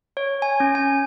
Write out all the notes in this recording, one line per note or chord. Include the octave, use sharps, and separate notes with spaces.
C#5
G#5
C#4
G#5